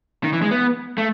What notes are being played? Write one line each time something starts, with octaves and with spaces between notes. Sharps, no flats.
D#3
E3
G#3
B3
A3